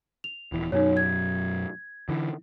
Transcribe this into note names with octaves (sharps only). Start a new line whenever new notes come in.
F7
D#1 E3
F#2 B2 F#3 D#4 C#5
G#6
D3 E3